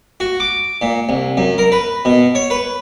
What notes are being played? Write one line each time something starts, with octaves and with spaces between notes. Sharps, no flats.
F#4
D6
A#2
C2
F#2
A#4
B4
B2
C#5
B4